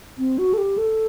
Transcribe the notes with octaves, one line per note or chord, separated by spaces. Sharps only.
C4
F#4
A4
G4
A4